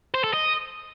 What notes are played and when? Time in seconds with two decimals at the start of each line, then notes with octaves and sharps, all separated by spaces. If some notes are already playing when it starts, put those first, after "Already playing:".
0.14 C5
0.24 A4
0.34 D#5